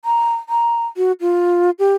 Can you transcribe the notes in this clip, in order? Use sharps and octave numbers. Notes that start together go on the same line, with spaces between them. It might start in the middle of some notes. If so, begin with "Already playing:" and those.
A#5
A#5
F#4
F4
G4